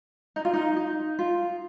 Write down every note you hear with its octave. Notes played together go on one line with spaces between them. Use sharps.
D#4
F4
D#4
D#4
F4